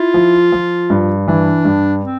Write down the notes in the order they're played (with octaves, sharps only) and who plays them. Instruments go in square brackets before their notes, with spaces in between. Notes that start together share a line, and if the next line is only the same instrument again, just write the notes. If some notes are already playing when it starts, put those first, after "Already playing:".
Already playing: [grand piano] E4 [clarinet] F4
[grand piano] F3
F3
G2
[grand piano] E3 [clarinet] D4
[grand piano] G2
[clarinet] C4